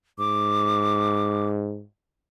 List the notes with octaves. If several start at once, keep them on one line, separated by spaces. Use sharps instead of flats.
G#2 D6